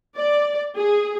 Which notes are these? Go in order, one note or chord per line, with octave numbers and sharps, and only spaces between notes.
D5
G#4